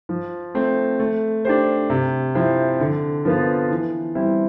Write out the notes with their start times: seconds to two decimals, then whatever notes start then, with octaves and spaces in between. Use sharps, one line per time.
0.09 F3
0.55 A3 C4
1.00 A3
1.45 D4 G4 C5
1.90 C3
2.35 F3 C4 E4
2.80 D3
3.25 F3 B3 F4
3.70 E3
4.15 G3 C4 E4